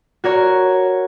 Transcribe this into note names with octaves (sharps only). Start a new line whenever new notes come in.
F#4 A#4 C#5